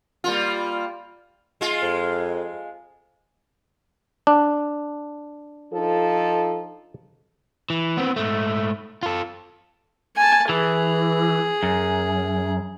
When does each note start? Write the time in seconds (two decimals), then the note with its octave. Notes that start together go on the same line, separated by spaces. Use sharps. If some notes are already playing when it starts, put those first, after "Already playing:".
0.24 G3 A#3 F4
1.61 G#3 F4
1.82 F2
4.27 D4
5.73 F3 D#4 A4
7.70 E3
7.97 B3 C4
8.16 G#2 A3
9.03 F4 A4
10.16 G#5 A5
10.49 E3 G#4
11.63 F#2